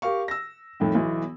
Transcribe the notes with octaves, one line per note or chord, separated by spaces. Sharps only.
G4 A#4 F5 C#6
E6 A#6
F2 A2 D#3
B1 E3